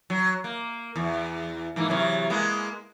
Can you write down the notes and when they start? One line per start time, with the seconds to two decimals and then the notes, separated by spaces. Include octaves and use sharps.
0.10 F#3
0.44 A#3
0.96 E2
1.76 G#2 E3 A#3
1.89 C3 E3 F#3
2.30 G#3 A#3 B3